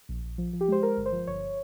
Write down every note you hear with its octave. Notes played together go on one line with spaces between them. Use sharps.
A#1
A#1
F3
F3
G4
G#3 C5
G#3 A#4
G1
C5
F3
G1 C#5